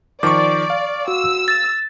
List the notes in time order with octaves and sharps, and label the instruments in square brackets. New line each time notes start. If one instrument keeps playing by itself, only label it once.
[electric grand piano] D#3 F3 [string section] D5 [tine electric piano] C#6 D6
[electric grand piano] F5
[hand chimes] F#4 [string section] E6
[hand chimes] A6